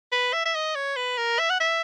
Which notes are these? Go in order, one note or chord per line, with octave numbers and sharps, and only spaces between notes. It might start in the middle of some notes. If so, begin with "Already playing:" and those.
B4
E5
E5
D#5
C#5
B4
A#4
E5
F#5
E5